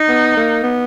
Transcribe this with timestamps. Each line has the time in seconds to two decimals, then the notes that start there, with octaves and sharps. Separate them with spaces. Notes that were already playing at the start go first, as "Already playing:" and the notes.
Already playing: D#4
0.09 B3
0.37 A#3
0.63 B3